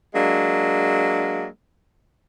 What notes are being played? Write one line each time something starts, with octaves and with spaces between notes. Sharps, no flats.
F#3 G#3 A#3 D4